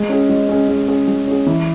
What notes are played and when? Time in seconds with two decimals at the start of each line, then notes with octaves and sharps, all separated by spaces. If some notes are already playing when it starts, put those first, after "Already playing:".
Already playing: G#3
0.09 C#4 G#4
0.29 G#3
0.49 C#4 G#4
0.69 G#3
0.88 C#4 G#4
1.07 G#3
1.27 C#4 G#4
1.46 E3